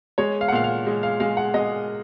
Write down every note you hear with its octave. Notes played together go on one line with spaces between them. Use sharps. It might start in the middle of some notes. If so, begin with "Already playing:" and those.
G#3 C#5
F5
F#5
A#2 F5
F5
G#3
F5
G#3 F5
F#5
G#3 D#5